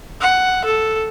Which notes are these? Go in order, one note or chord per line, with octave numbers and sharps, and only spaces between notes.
F#5
A4